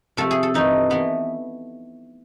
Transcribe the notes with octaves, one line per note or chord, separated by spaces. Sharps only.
C3 F3 A3 A4
G#4
A4
G2 E3 A3 D#4
E3 A3 B3